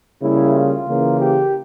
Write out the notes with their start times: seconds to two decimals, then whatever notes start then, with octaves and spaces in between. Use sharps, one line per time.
0.21 C#3 G3 A#3 E4
0.54 F4
0.87 C#3 E3 A#3
1.20 G4